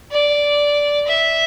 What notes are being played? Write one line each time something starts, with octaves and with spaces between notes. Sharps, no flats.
D5
E5